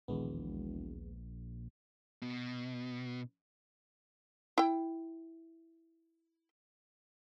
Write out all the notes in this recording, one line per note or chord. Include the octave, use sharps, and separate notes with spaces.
E1 A#1 D#2 G#3 B3
B2
E4 G5